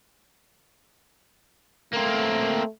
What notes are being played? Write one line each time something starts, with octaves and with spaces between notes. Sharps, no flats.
A3 A#3 C4